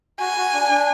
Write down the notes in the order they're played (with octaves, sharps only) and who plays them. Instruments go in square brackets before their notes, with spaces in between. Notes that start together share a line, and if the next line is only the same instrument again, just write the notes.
[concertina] F#4 [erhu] G#5
[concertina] F#4
D4
D4